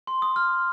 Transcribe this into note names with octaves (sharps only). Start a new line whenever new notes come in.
C6
D#6
F6